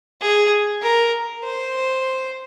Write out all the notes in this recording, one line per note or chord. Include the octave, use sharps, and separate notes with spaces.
G#4
A#4
C5